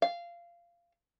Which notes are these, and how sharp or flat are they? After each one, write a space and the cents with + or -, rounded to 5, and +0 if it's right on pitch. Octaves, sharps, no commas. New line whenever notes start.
F5 -15